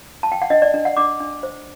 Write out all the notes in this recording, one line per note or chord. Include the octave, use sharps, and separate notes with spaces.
A5
G5
F#5
D4 D#5
D5
D4
F#5
D4 D6
D4
C5